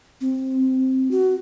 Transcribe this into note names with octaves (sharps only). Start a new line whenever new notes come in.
C4
F#4